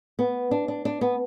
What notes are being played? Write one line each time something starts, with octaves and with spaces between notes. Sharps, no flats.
B3
D4
D4
D4
B3